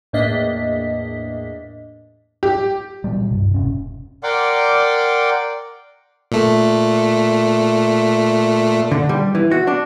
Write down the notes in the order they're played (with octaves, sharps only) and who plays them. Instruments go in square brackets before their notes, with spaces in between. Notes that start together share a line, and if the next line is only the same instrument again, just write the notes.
[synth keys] E2 A2 A#3 D4 D#5 B6
[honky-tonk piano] G4
[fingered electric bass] A#2 E3 F#3 G3
G2 C3
E1 C#4
[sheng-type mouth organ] A#4 D5 F#5 G5 C6 D6
[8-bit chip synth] A#2 A3
[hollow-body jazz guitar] D3
G3
E3
F#4
D4